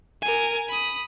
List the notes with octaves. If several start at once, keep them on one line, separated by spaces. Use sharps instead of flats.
A#4 G#5
B5 D#6